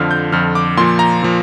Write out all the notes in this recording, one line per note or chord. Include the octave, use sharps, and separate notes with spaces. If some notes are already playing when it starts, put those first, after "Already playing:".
Already playing: F2 D3 F3 F6
G6
F2 D3 F3 F6
D6
A#2 F3 C6
A#5
A#2 F3